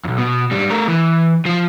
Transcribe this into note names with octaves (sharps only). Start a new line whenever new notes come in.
B1 F2
B2
G#2 G3
A3 A#4
E3
F3 F4